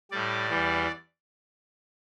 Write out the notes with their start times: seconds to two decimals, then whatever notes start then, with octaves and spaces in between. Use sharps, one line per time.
0.11 A2 G3 D5
0.49 E2 E3 G3